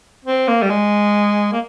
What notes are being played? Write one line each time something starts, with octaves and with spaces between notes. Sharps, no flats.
C4
A#3
G3
G#3
A#3